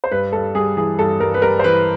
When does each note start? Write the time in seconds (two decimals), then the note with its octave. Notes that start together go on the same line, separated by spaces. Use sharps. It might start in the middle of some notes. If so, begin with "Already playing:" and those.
0.04 C5
0.11 G2 B4
0.32 G2 A4
0.55 G3 G#4
0.77 E3 G#4
0.99 G2 A4
1.20 G2 A#4
1.34 B4
1.42 G3 A#4
1.59 C5
1.64 E3 B4